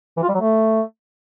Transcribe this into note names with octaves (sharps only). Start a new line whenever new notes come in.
E3
F4
G3
F#3
A3